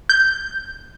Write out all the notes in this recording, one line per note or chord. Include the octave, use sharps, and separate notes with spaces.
G6